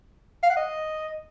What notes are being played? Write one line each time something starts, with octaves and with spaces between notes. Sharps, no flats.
F5
F#5
D#5